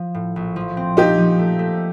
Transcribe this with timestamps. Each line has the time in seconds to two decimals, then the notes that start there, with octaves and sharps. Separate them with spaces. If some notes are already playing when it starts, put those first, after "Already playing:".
Already playing: F3
0.15 A2
0.36 A#1
0.56 F3
0.77 C4
0.97 A#2 D#4 G4
1.18 F3
1.39 A3
1.59 A3